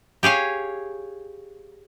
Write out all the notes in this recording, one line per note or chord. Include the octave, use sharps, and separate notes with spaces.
G4 G#4 C#5 F5